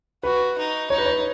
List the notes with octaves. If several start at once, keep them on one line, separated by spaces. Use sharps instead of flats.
F#4 B4
D#4
D#4 C#5
B4
C#5